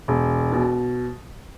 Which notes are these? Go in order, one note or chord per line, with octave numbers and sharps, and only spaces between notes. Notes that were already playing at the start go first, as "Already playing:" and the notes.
E1
B2